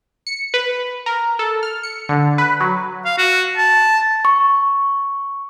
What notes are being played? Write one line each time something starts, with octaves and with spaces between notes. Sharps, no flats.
C#7
B4
A#4
A4
F6
C#7
D3
B4
F#3
F5
F#4
A5
C#6